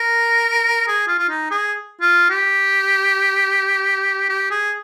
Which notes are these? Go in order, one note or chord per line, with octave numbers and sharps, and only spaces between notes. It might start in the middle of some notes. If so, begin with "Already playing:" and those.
Already playing: A#4
G#4
F4
F4
D#4
G#4
F4
G4
G4
G#4